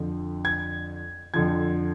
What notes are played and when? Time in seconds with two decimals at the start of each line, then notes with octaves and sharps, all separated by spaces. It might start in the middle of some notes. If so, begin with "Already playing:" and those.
Already playing: F2 D3 F3
0.45 G#6
1.34 F2 D3 F3 G#6